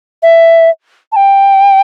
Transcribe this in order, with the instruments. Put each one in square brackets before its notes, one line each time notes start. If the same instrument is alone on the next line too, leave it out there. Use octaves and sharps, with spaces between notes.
[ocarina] E5
A5
G5